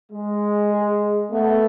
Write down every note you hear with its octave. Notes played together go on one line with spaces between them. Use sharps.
G#3
G#4
A3 B3